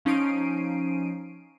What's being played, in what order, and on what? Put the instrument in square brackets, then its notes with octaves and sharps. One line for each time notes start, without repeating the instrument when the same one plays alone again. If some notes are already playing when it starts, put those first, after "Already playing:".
[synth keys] F3 C#4 D#4 C7 D7 D#7